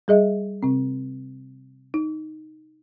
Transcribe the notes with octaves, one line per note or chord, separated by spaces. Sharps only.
G3 G#4 D#5 E5
C3 C4
D#4